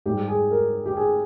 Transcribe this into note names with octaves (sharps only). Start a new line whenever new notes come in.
G#2 G3 G4
G#4
A#4
G4
G#4